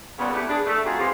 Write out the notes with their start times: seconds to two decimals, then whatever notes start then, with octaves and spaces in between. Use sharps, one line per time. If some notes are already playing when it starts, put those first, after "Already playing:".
0.19 A#2 C#3 G3 B3
0.33 A3 B3 E4 G4
0.49 D4 G#4
0.66 A3
0.85 C4 D#4 F4 F#4 G#4
0.99 E3 G#3 C4 F4 G4 G#4